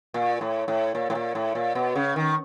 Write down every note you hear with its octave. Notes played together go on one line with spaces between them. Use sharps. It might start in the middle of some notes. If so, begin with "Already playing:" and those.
A#2
A2
A2
A#2
A2
A#2
A2
A#2
B2
C#3
D#3